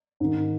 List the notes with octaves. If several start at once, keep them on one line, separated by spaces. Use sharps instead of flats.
G#2 D#3